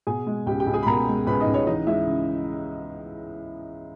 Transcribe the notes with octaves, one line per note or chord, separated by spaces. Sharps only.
B2 G#4 G#5
G#3
C#2 G4 G5
G4 G5
C#2
G#4 G#5
B5
B2 A#4 A#5
G#3
C#2 B4 B5
D#4 D#5
C#2
C#4 C#5
E3 D#4 D#5
G#3 E4 E5
C#3